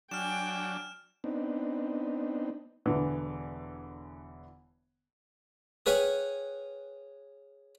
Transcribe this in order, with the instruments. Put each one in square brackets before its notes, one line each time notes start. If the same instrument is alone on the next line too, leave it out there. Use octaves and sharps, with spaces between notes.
[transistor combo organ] F#3 D4 [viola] G5 G#5 [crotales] F6 E7
[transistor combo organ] B3 C4 D4 D#4
[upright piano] E1 D3 E3
[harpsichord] G#4 B4 C#5 F5 G5 G#5